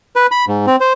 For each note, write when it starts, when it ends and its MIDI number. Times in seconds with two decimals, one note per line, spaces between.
0.16 0.27 71
0.31 0.45 83
0.48 0.66 44
0.66 0.76 60
0.80 0.93 72